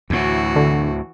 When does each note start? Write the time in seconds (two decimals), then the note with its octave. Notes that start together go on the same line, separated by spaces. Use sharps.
0.10 D2 A2 E3 F#4
0.56 D3